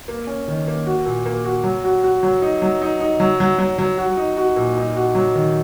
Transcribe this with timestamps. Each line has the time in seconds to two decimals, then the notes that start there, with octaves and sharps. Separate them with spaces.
0.08 A#3
0.27 C#4
0.48 D#3
0.67 A#3
0.86 F#4
1.06 A#2
1.26 A#3
1.44 F#4
1.64 F#3
1.84 F#4
2.03 F#4
2.23 F#3
2.42 D#4
2.62 F#3
2.82 D#4
3.00 D#4
3.20 F#3
3.40 F#3
3.59 F#3
3.78 F#3
3.98 F#4
4.17 D#4
4.37 F#4
4.56 A#2
4.77 D#4
4.96 F#4
5.15 F#3
5.35 D#3